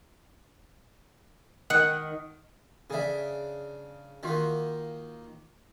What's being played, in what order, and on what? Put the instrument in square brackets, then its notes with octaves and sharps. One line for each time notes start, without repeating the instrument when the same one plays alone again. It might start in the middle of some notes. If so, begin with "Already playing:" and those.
[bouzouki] D#3 [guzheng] F#5
[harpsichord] C#3 D4 [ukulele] G#4 E5
[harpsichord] D#3 A#3 [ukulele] F4 F#4 E5